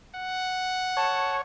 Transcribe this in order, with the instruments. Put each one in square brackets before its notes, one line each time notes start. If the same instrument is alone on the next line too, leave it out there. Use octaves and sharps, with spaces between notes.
[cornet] F#5
[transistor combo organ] C#5 [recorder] A5